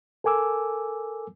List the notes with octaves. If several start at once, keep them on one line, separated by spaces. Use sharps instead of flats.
A4 A#4 G#5 D6 E6